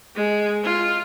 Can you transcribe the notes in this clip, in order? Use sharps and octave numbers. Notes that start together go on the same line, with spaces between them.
G#3
F4